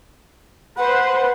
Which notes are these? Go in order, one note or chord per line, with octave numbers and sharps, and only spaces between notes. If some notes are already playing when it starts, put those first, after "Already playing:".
B4 C5 F#5